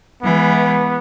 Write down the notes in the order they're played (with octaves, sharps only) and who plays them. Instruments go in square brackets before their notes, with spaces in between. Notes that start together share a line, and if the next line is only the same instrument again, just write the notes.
[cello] E3 G#3 [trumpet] B3